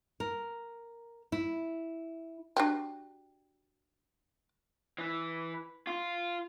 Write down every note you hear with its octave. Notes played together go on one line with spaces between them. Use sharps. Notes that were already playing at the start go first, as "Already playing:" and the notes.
A#4
E4
D4 F#4 G4
E3
F4